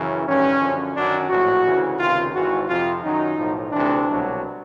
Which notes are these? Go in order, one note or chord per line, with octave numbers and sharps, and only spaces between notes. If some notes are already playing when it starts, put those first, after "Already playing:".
Already playing: F#2 C#3 E3
A1 G2 D#3 C#4
F#2 D3 F3
F#2 D#3 F#3 D4
A#1 A2 F#3 F#4
D2 C#3 E3
C#2 C3 D#3 F4
G#1 G#2 E3 F#4
F2 C3 F3 F4
F#2 D#3 F#3 D#4
B1 A2 F3
D2 C3 E3 D4
C2 B2 F#3